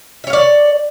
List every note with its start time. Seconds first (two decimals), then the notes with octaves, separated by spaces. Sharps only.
0.24 E5
0.27 C#5
0.30 F5
0.33 D5